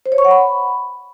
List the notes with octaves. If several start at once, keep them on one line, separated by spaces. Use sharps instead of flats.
C5
C#5
C#6
F#5
B5